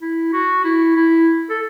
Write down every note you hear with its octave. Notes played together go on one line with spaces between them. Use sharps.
E4
F#4
E4
E4
A4